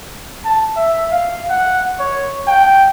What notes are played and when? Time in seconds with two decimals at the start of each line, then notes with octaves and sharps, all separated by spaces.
0.45 A5
0.76 E5
1.12 F5
1.50 F#5
2.00 C#5
2.47 G5